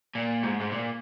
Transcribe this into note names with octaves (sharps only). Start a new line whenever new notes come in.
A#2
G#2
G#2
A#2